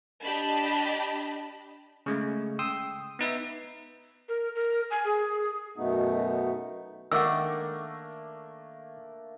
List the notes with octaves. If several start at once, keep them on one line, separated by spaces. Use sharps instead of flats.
D4 G4 D#5 A5 B5
C#3 G#3 A3
G5 C6 D#6 E6
B3 D#4 B4 E5
A#4
A#4
G#5
G#4
F#2 B2 A3 B3 D#4
D#3 A3 A#3 D4 F#5 G5 E6